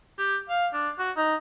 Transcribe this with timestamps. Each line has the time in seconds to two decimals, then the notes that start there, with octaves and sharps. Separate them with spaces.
0.18 G4
0.49 F5
0.73 D4
0.99 F#4
1.17 D#4